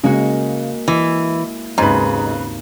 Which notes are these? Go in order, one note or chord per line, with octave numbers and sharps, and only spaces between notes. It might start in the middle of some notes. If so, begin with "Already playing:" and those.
C#3 G#3 A#3 F#4
E3 D#5
G#1 D#2 G#2 C#3 B4